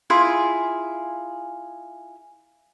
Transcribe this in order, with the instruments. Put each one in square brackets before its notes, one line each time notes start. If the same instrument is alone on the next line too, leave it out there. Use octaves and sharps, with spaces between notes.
[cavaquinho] E4 F4 G#4 G#5